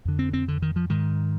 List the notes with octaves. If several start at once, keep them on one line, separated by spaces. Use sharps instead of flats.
F2 D3
C4
C4
D3
D#3
F3
G#2 D#3